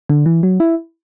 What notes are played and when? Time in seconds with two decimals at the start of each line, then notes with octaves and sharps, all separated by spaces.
0.09 D3
0.26 E3
0.43 F#3
0.60 E4